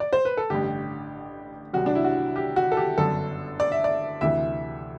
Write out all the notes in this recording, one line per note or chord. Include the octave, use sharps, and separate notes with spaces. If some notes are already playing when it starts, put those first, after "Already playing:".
D5
C5
B4
A4
A1 G2 D3 G4
C2 C3 F#3 F#4
D4
E4
F#4
G4
F#4
A4
G4
G1 F#2 D3 F#3 A4
D5
E5
D5
D2 C3 E3 E5